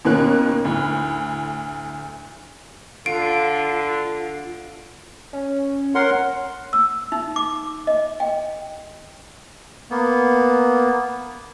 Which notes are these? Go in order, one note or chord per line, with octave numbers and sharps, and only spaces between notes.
D#2 B2 A#3 C#4 F#6
D2 A2
D3 F4 D7
C#4
A#4 C#5 F#5 C6
E6
D#4
D6
D#5
G5
A#3 B3